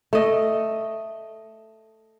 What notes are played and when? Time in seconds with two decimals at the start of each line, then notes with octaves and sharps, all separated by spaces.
0.13 A3 D#5